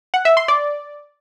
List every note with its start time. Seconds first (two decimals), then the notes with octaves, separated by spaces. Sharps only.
0.14 F#5
0.25 E5
0.37 C6
0.48 D5